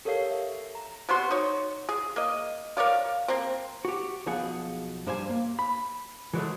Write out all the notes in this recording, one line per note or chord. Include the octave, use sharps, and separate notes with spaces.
G4 A4 A#4 C#5 F5 C7
E5
A#5
C3 B3 F#4 C6
D#4 C#5
G#4
A#3 D#5
A#4 C#5 D5 F5
A#3 C4
F#4 G4
B1 B2 F3 G#4 F#5
G2 G3 C5 D#5 G#5
A#3
B5
E3 F#3 G#3 A3